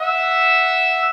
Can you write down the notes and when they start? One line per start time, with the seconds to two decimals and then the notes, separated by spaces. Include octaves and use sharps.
0.01 E5 F#5 E6